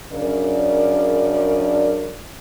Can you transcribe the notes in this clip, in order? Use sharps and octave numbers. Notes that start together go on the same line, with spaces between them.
F#2 C#3 D4 A#4 D5